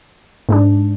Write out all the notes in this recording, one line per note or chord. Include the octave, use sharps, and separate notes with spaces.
G#2 G#3 D4